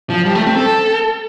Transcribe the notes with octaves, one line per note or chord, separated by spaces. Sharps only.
F3
G3
A3
C4
A4